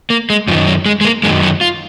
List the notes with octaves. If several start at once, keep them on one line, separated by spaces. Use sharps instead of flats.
A#3
G#3
F#2 D#3 F3
F#3
G#3
G#3
A#3
F#2 D#3 G#3
F#3
F4